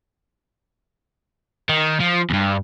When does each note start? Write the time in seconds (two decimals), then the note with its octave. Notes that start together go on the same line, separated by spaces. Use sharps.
1.69 D#3
2.00 F3
2.30 E2 G2